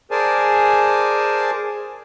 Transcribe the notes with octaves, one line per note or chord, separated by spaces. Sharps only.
G#4 A#4 C5 D5 G#5 A5